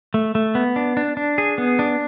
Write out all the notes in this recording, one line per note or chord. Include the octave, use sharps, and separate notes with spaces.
A3
A3
B3
D4
D4
D4
G#4
B3
D4